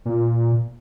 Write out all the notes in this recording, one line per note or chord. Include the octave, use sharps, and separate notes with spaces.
A#2